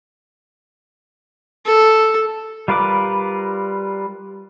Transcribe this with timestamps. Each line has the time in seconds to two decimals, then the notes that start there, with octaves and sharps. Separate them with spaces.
1.66 A4
2.68 G3 F4 A#4 B4 D6